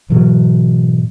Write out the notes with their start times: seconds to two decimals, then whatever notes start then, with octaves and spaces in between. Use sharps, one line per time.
0.10 G#2 B2 E3 F#3